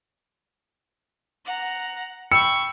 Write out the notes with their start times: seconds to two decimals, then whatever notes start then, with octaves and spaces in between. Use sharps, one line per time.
1.45 F#5 A#5
2.32 G5 B5 C#6 E6 C#7